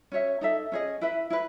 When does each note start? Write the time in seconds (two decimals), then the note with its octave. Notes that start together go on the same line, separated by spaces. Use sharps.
0.12 C#4 F#4 C#5 E5
0.41 D#4 A4 E5
0.72 C#4 G#4 D#5
1.01 E4 B4 E5
1.30 E4 B4